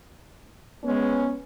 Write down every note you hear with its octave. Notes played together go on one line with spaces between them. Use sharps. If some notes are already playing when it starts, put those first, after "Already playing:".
G#3 B3 C#4